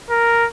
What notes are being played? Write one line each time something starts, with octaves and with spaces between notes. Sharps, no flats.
A#4